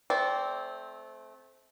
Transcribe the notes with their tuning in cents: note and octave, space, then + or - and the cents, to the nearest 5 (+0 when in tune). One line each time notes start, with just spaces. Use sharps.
A3 -25 C4 +0 D5 -25